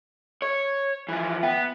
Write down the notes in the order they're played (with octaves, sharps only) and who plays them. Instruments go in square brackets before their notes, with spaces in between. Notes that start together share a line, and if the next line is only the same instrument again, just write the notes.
[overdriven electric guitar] C#5
E3 F3
[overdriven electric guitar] B3 [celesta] E5 G5